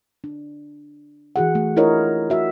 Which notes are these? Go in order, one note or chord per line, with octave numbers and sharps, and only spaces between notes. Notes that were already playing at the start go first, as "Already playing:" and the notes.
D4
E3 F#4 G#4 F#5
A3
D4 E4 F4 A#4 C#5 D#5
F#4 E5